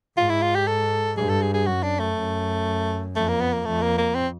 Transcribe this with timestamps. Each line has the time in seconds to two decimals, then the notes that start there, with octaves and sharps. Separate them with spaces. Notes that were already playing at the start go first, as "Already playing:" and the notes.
0.17 G#2 F4
0.30 E4
0.42 F4
0.55 G4
0.67 A4
1.16 G2 G#4
1.29 A4
1.42 G#4
1.54 G#4
1.67 F#2 F#4
1.83 D4
2.00 A3
2.16 F#2
3.15 F2 A3
3.28 A#3
3.41 B3
3.53 A#3
3.65 F2 A3
3.81 A#3
3.98 A#3
4.15 C4